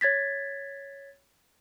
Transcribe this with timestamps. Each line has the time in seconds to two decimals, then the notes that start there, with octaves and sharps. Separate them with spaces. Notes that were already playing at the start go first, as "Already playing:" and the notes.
0.01 C#5 G#6 A6 B6